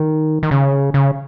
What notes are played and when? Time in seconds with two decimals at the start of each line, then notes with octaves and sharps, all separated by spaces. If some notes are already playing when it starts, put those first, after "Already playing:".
Already playing: D#3
0.43 D#3
0.51 C#3
0.94 C#3